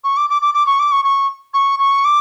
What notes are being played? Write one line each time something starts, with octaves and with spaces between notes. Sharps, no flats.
C#6
D6
D6
D6
D6
C#6
D6
C#6
C#6
C#6
C#6
D6